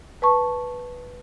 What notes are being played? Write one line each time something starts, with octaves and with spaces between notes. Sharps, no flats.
B4 A5 C#6